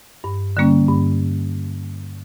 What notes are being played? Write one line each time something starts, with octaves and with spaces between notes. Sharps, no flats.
G2
D3 G3 A#3 C#4
G2